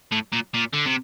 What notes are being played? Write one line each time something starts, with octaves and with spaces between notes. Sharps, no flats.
A2
A#2
A#2
D3
C3